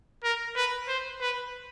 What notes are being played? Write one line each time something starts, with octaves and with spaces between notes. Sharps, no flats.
A#4
B4
C5
B4